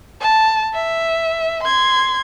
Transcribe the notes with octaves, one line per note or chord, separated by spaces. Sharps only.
A5
E5
C6 G#6